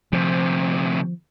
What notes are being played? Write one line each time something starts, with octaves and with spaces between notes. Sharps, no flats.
D2 C3 F3